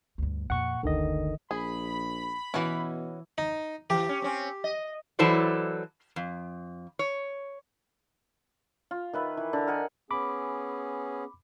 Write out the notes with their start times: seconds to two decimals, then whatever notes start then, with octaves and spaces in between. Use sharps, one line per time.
0.18 D2 G2
0.50 F2 A#2 F#5 C#6
0.83 F#1 D2 D3 D#3 D#5
1.51 A#1 G#4 B5
2.54 B2 E3 C#4 E4 F#4 B4
3.38 D#4
3.90 E3 G4
4.09 C#4
4.22 C4 C#4
4.64 D#5
5.19 E3 F#3 E4 A4 C5 D5
6.16 F2
6.99 C#5
8.91 F4
9.13 D#3 B4 E5
9.37 E3
9.53 D3
9.67 A#4 D#5 F#5 G#5
10.11 B3 C#4 G#4 B5 D6